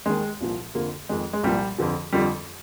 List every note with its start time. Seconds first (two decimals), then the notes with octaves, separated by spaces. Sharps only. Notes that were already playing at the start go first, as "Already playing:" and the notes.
0.06 D#2 D#3 G#3
0.41 C2 A#2 F3
0.75 F2 D3 F3 A#3
1.09 F2 D#3 G#3
1.33 G#3
1.43 C2 A#2 F3 G3
1.78 F2 D3 F3
2.12 F2 D3 F3 G3